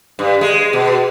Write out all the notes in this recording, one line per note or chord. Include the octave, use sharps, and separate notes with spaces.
G2
G#3
B2